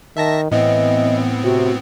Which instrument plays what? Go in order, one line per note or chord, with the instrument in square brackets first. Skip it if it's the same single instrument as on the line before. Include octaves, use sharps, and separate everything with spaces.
[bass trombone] D#3 [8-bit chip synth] E5 A5 A#6
[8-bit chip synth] A2 B3 C4 [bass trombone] E3 [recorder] D#5
[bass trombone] C3 [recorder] F#4